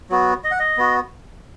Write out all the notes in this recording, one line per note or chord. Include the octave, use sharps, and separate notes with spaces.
F#3 B3 F#4
D#5
F#5
D#5
B3 F#4